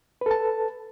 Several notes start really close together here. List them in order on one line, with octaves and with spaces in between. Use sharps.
B4 A4 A5